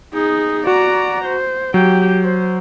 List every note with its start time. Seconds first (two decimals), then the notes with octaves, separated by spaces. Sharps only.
0.13 D#4 G#4
0.67 F#4 D5 A#5
1.24 C5
1.74 F#3 G4 G5
2.22 C5